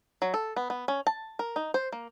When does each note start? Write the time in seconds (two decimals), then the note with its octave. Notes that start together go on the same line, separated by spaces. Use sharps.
0.22 F#3
0.34 A4
0.57 B3
0.70 B3
0.88 C#4
1.07 A5
1.39 A#4
1.56 D#4
1.74 C5
1.92 A#3